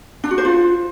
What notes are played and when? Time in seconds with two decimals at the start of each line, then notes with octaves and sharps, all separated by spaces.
0.24 D4
0.31 F#4
0.38 C5
0.45 F4